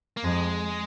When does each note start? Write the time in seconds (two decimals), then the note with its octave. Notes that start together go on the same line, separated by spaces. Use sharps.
0.17 A#3
0.24 F2 G#3